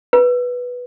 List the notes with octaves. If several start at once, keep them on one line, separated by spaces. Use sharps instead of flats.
B4